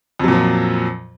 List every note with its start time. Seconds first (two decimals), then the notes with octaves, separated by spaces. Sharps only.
0.19 F2
0.24 F#3
0.28 A#2
0.32 F3